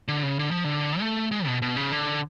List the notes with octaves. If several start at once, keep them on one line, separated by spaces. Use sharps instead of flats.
D3
C#3
D3
F3
D3
A3
G#3
B2
B2
C#3
D3